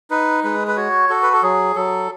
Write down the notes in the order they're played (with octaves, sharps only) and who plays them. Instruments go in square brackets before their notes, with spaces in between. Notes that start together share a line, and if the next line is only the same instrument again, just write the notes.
[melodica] D#4 B4
G#3 B4
B4
F#4 C#5
F#4 A4
B4
A4
F#3 G#4
F#3 A4